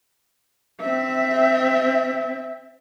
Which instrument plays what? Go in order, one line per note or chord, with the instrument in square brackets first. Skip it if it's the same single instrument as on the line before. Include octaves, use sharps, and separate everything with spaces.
[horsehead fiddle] C4 E5